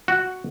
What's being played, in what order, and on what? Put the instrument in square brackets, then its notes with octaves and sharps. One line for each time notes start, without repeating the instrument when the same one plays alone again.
[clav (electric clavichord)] F#4